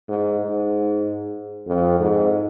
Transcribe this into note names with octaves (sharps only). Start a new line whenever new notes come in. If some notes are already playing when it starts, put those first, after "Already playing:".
G#2
G#2
F2
G#2